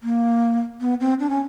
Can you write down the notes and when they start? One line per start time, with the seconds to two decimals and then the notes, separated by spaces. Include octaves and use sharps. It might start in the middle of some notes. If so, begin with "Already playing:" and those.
0.03 A#3
0.81 B3
1.00 C4
1.20 D4
1.30 C#4